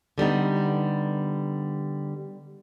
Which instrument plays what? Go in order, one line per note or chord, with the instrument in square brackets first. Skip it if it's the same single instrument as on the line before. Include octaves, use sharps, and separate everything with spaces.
[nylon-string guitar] D3 G3 B3 D#4